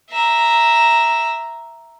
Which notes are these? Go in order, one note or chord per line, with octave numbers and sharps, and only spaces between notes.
E5 A#5